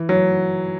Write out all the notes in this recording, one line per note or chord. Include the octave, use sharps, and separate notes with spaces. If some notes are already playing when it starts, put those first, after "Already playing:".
Already playing: E3
F#3